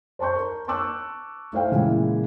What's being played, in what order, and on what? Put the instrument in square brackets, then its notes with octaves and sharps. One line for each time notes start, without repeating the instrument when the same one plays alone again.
[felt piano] C5 A5 C6 C#6 G6
A#4
A5 C#6 D6 E6 F#6
A3 E4 C5 F5 G5
A#2 C#3 E3 G#3 E4